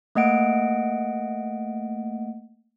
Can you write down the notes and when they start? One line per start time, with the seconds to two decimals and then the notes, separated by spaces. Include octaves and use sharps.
0.15 A3 A#3 D#5 F#5 D7